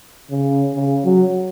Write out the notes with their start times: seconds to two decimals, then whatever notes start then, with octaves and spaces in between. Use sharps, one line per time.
0.30 C#3
0.74 C#3
1.04 F#3